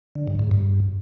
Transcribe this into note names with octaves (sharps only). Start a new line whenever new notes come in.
D3
G2
G#2
G2